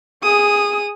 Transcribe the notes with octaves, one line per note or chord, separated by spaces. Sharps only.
G#4 D#6